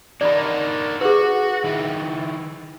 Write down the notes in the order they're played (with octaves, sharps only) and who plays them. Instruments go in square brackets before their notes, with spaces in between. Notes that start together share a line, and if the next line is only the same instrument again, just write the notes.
[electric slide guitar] D4 D#4 A#4 [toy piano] D5 B5
[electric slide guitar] F#4 [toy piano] G#4 B4
[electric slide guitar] D#3 E4